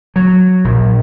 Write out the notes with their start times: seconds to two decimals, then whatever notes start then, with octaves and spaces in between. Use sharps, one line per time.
0.16 F#3
0.64 A#1